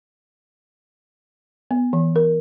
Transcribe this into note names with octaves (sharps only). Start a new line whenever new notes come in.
B3
E3
A#4